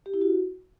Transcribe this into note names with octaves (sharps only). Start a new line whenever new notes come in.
G4
E4
F#4